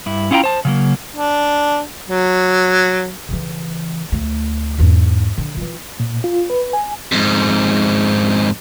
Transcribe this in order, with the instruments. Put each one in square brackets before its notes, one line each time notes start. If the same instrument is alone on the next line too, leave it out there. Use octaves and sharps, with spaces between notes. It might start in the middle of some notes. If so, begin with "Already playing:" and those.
[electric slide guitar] G2 E4
C#4 E4 F4 E5 G5 A#5
C5 A5
C#3 F#3 A#3
[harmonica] D4
F#3
[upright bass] C#3 E3
D2 A3
E2 G#2
D3
E3 F4
[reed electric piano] A#2
F4
B4
G#5
[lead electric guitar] F2 G#2